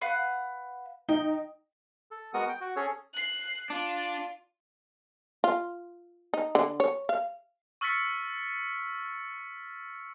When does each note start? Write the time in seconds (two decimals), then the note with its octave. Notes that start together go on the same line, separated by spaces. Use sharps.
0.01 B4 F5 F#5
1.09 D#4 G5
2.11 A4
2.34 G#3 B3 F#4 A#4 F#5 D#6
2.49 G5
2.61 F#4
2.76 C#4 G#4 A4 C#5
3.14 F#6 C7
3.70 D4 F4
5.44 F4
6.34 D#4
6.55 D3
6.80 C#5
7.09 F5
7.81 C#6 E6 F6 A6 B6 C#7